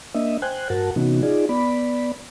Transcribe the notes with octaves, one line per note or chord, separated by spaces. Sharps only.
A#3 D4 D#5 E5
C5 G5 G#5 F#6
G2 F#4 A#4 F#5 A5
C3 E3 B3 C#4 D#4 F#4
D#4 F4 G#4 D5
B3 D5 B5